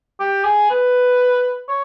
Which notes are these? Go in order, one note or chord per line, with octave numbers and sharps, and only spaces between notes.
G4
G#4
B4
C#5